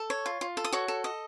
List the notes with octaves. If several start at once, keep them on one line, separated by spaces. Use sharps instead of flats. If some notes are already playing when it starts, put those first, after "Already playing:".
Already playing: A4
C#5
F4
F4
A4
D#6
F#4 C#5 C#6
A4
D#5